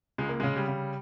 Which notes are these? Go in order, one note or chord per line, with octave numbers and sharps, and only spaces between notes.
C#2 G#3
A#3
C#3 G#3
G3
C#3